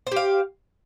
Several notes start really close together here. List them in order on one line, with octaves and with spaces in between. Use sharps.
C5 G4 F5